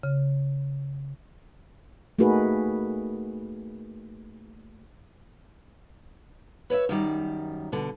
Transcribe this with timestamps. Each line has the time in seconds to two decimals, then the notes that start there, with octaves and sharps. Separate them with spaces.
0.03 C#3
2.19 A3 A#3 D#4 F#4 G#4 B4
6.70 B4 C#5 D#5 E5
6.89 F#2 D#3 G3
7.72 B2 D3